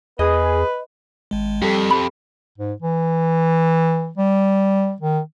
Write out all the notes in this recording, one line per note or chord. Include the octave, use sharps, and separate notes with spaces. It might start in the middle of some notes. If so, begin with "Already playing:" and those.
E2 G#4 B4 D#5
G#1 G#3
F2 G3 G4 A4
B5
G#2
E3
G3
D#3